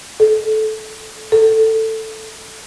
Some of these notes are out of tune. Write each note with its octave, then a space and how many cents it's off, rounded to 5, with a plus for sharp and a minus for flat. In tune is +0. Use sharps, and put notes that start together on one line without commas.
A4 -20
A4 +10